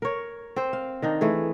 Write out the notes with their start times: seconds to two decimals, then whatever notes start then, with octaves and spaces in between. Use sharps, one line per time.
0.02 A#4 C#5
0.56 C4 C5
0.73 F5
1.02 D#3 D4 D#4
1.21 E3 A3 G#4